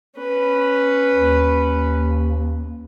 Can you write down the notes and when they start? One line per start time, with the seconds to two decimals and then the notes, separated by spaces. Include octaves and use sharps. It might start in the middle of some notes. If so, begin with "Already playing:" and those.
0.18 C#4 B4
1.14 D#2